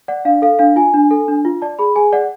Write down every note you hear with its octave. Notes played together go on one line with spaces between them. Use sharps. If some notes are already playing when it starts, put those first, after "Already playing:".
D5 F#5
D4 F5
A4 F5
D4 F5
F4 G#5
D4
A4
D4
F4
D5 A5
G#4 B5
G#4 G#5
D5 F#5